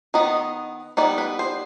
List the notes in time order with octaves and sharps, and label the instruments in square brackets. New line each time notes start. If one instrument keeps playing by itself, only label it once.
[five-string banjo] D#3 B3 D#4 D#5
G3 B3 D#4 D5
B4
C5